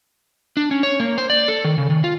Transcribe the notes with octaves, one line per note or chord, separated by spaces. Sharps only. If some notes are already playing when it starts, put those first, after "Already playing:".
D4
C#4
C#5
A#3
C5
D5
A4
D#3
C#3
D#3
F4